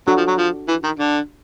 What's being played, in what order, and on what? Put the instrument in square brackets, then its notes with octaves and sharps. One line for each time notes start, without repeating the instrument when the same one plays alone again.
[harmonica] F#3 [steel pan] D4 F#4 A4
[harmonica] F3
F#3
F3
E3
D#3
D3